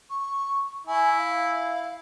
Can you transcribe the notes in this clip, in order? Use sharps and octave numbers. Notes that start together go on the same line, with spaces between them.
C#6
E4 G#5
F5